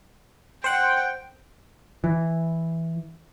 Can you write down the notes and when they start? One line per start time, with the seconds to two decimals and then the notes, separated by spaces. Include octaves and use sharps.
0.64 C5 F#5 G5
2.04 E3